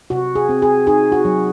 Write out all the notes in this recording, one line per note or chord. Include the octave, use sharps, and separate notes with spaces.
C3 F#4
G#4
C4
G#4
D#4 G#4
F#4
F#3